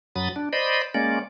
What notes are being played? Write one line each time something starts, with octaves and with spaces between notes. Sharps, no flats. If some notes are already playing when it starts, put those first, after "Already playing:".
F#2 F#3 B5 D#6 A6
D4
C5 D5 D#5 B5
G#3 A#3 C#4 D5